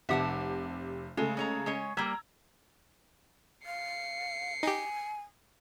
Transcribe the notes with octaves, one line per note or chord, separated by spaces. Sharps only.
F1 C3 E5 F#5 A5 D6
C#3 G#3 A3 A4
G#3 C#5 A#5
G#3 C#4 C#5
G3 A#3 A#5 E6 G#6
F5 C7 C#7
D#4 G4 G#5